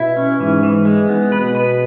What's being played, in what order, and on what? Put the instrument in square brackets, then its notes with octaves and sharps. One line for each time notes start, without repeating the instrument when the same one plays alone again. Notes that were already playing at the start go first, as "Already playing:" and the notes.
Already playing: [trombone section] B2 [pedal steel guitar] E4
[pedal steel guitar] C#4
[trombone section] G#2 [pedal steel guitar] E3
[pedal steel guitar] E3
G#3
B3
[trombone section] B2 [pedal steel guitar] B4
[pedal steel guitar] B4